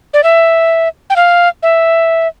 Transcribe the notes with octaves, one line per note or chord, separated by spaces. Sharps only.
D5
E5
G5
F5
E5